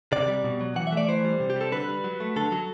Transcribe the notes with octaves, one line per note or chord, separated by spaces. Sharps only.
C3 D5
G3
B2
F#3
E3 F#5
E5
A3 D5
E3 C5
G3
C3
G4
G3 A4
D3 B4
G3
F#3
A3
D3 A4
F#3